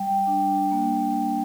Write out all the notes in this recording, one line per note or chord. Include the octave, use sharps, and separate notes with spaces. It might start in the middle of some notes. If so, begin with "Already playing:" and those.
Already playing: G3 G5
D4
A#3